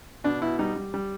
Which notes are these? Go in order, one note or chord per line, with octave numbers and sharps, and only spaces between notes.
B2 D4
B2 E4
G3 D#4
G3
G3